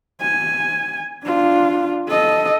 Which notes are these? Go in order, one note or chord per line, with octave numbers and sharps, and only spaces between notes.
G#5
D4 F4
A4 D#5